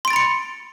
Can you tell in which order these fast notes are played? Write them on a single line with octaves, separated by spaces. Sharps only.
C6 D7 A6 B5 C#7